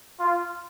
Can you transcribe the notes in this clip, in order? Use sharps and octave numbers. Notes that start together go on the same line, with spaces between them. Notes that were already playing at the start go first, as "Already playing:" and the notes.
F4